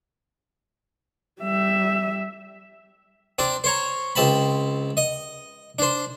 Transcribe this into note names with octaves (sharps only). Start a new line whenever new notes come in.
G3 E5
C4 D4 D5
C5 C#5 A#5
C#2 C4 A5 B5
D#5
D4 C5